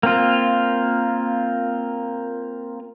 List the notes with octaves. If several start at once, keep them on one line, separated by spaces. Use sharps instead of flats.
A#3 C4 F4